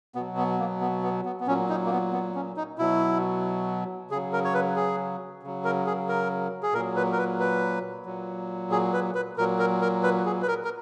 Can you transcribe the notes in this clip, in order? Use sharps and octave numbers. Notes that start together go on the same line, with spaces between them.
B2 F#3 B3
B3
A#3
B3
B3
B3
B3
A#2 F#3 C#4
D#4
A#3
B3
B3
C#4
D#4
B2 F#3 E4
C#3 F#3 G#4
A#4
C#5
B4
G#4
C#3 F#3
A#4
G#4
A#4
G#4
A#2 F#3 A#4
B4
A#4
B4
B4
A#2 F#3
G#4
B4
B4
A#2 F#3 A#4
A#4
A#4
B4
G#4
B4
A#4
A#4